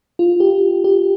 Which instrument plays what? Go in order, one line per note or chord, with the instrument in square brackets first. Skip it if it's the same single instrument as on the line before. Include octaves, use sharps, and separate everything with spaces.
[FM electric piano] F4
G4
G4